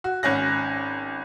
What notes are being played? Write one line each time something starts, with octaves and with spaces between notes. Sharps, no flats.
F#4
G#1 C#4 F#6 A#6